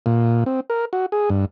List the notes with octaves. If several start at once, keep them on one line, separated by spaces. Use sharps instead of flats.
A#2
C4
A#4
F#4
G#4
G2